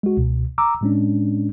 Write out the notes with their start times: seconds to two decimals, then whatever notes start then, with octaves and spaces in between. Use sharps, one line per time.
0.03 G#3 F#4
0.17 C#2 B2
0.58 A#5 D6 E6
0.81 A2 G#3 C#4 D4